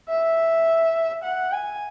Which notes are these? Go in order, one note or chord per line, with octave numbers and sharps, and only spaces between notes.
E5
F#5
G#5